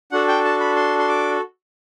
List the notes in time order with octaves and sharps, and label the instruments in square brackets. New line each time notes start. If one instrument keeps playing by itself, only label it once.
[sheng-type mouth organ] D4 F#4 A4 F#5
G5
A5
B5
C6
C6
D6